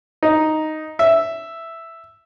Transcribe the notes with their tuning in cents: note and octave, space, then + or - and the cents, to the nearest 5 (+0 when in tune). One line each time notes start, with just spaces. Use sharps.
D#4 +0
E5 +0